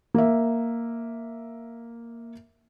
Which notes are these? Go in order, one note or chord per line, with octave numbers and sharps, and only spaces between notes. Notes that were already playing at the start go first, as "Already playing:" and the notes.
A#3 E5